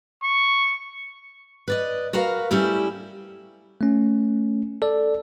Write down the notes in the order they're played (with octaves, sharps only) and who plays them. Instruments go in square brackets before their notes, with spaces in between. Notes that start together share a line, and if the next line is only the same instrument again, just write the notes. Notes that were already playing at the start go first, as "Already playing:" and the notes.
[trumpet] C#6
[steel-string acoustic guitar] B4 D5 D#5
F#4 A#4 B4 F5
G3 A3 C#4 E4 G4
[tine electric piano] A3 C#4
A4 D5